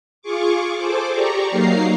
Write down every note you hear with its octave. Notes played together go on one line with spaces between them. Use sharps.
F4 G#4 C#6 D6
G#4 A4 C5 D6
G4 D5 A#5 C#6
F#3 A#3 D#4 F5 A#5 C7